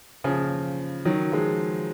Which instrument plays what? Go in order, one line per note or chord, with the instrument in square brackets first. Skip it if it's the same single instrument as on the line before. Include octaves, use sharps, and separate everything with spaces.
[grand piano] C#3 F3
D#3 F#3
F3 G#3